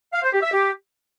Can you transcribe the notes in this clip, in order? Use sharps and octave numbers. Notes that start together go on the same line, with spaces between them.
F5
C5
G4
E5
G4